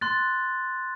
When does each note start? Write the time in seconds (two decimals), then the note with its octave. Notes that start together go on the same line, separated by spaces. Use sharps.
0.01 C6 F#6 A6